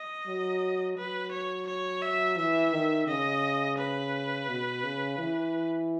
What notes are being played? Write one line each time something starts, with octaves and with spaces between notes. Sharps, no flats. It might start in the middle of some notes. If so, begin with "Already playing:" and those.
Already playing: D#5
F#3
F#3 B4
C#5
C#5
E5
E3 E5
D#3
C#3 D#5
B4
B2
C#3
E3